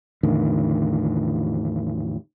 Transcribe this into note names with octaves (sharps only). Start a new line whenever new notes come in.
E2 A2 D3 D#3